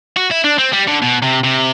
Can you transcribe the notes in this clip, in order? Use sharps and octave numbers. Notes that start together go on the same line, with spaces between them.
F#4
E4
D4
C4
G3
D3
B2
C3
C3